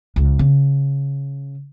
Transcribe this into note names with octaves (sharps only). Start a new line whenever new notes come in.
C#2
C#3